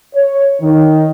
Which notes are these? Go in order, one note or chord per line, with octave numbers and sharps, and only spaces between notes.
C#5
D#3